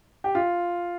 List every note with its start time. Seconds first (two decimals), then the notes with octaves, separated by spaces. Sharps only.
0.24 G4
0.35 F4